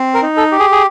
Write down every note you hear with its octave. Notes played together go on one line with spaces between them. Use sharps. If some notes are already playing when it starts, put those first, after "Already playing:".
Already playing: C4
A#4
D#4
A4
G4
G#4
G#4